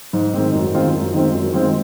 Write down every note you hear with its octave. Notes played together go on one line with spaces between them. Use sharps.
G#2
D#3 G#3 C4
F#2
D#3 G#3 C4 F4
F#2
D#3 G#3 C4 F4
F#2
D#3 G#3 C4 F4